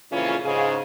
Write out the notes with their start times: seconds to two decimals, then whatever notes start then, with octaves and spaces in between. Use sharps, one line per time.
0.11 F2 A#2 C#3 E3 C#4 F4
0.45 G#2 C#3 G#4